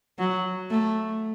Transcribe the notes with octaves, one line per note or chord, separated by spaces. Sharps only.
F#3
A3